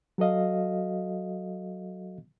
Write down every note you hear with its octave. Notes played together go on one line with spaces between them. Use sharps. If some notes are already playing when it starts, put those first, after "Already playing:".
F#3 F#4 A4 D#5 F5